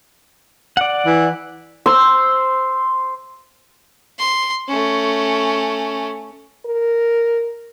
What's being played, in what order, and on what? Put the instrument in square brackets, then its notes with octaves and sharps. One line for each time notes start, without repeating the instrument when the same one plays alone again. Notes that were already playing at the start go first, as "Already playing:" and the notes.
[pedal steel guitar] D5 F#5
[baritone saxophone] E3
[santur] C5 C6 E6
[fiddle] C6
A3 C#4
[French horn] A#4